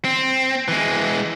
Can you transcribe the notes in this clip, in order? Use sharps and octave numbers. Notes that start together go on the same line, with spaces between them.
C4
E3 G#3